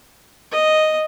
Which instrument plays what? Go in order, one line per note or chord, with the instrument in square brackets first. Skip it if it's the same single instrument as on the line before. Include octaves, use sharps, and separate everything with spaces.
[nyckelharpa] D#5